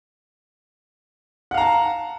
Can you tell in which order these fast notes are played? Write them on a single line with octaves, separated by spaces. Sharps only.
F#5 F5 A#5 A5